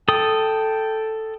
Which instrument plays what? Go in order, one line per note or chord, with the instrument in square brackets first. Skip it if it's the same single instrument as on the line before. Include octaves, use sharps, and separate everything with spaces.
[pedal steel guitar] A4 D#6 [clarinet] G5